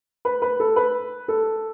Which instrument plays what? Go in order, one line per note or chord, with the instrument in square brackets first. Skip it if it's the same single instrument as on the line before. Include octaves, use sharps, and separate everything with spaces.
[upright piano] B4
B4
A4
B4
A4